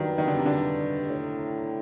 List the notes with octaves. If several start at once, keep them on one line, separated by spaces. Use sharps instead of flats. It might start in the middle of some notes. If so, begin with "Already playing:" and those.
Already playing: G2 D#3 F#3 G3
D#3
D3
C3
D3
A2